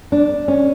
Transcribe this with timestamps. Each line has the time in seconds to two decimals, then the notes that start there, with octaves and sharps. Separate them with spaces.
0.12 D4
0.48 C#4